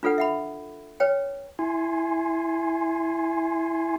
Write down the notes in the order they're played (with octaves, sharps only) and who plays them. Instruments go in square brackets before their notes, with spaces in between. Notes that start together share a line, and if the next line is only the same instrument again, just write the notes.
[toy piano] D4 F4 A4 B4 F#5
E5 F#5 B5
B4 C#5 G5
[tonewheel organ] E4 G#5 C6